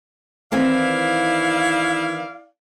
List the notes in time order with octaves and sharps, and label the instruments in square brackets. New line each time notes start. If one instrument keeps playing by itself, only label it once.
[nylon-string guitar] D#3 E3 C4 [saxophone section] E4 D5 F5